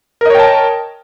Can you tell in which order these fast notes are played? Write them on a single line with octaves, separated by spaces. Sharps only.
A#4 D#5 C#5 G5 A5